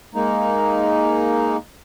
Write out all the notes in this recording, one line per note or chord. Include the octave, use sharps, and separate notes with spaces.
G#3 A#3 D#4